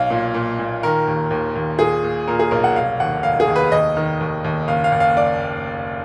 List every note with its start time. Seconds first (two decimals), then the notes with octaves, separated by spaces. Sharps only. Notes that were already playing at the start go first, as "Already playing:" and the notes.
Already playing: B1 F5
0.10 A#2
0.34 A#2
0.59 A#2
0.83 D#3 A#4
1.07 D#2
1.31 D#2
1.55 D#2
1.79 A#2 G#4
2.03 A#2
2.28 A#2 A#4
2.39 G#4
2.51 B1 A#4
2.64 F#5
2.76 F1 F5
3.00 D#2 F#5
3.23 F1 F5
3.40 G#4
3.47 D#2
3.56 B4
3.72 D#2 D#5
3.97 D#3
4.20 D#2
4.44 D#2
4.68 F#1 F5
4.84 F5
4.92 F#1
5.00 F5
5.17 D5